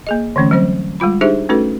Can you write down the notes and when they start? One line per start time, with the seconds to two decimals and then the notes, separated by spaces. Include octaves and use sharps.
0.07 A#3 G#4 D#5
0.36 D3 E3 A3 C#4
0.51 F#3 G3 C4 C5
1.00 G3 G#3 F4 B5
1.21 D4 D#4 G4 G#4 C5 E5
1.49 A3 C#4 D#4 F#4 A4 B4